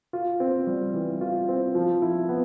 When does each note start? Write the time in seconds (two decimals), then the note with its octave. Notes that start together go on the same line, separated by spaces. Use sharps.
0.13 F4
0.40 C4
0.67 G3
0.93 E3
1.21 F4
1.49 C4
1.75 F3
2.02 E4
2.29 B3